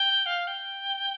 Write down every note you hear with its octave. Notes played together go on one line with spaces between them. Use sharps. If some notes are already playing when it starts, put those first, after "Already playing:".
Already playing: G5
F5
G5